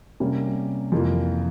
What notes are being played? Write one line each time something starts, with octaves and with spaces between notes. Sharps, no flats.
C3 G3 A#3 C#4
F2 C3 E3 A#3 F4